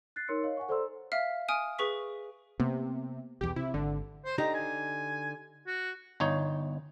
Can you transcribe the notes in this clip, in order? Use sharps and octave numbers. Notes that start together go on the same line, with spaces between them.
F#6 A6 C7
D#4 A#4 C#5 C6 E6 C#7
C#5 D#5 F5
F#5 G#5 C#6
A4 C5 D5 A#5 C6 E6
E5 F5 F6
G#5 D#6 F6 D7 D#7
G#4 B4 C#6 B6
C3 A#3 B3
B1 E2 G4
C3 E4
G#1 D3
C5
D3 D#4 G4 A#5
G#5
F#4
G1 D#4 C#5